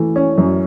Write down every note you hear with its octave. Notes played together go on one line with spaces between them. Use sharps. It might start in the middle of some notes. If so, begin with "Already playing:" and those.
Already playing: E3 A3
C#4
F#2